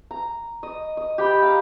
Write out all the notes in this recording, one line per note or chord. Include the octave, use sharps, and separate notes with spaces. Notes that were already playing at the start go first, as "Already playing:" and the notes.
A#5
D#5
D#5
G4 G5 B5
F5 A#5